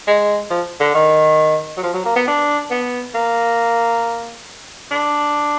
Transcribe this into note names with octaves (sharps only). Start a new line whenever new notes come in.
G#3
F3
D3
D#3
F#3
F3
F#3
A#3
B3
D4
B3
A#3
D4